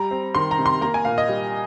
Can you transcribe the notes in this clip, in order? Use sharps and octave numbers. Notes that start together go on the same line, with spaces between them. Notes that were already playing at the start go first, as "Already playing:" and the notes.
Already playing: G3 A#5
C4
D#3 C6
A#5
C3
C6
A#3 A#5
G#5
A#2 F5
D#5
G3